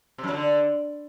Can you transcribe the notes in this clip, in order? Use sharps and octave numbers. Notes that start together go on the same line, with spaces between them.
C3
F#2
F#3
D3